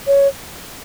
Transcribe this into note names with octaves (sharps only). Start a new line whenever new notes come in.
C#5